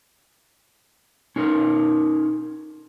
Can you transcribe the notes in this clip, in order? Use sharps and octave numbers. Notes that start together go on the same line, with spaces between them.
C#4 D#4 A#4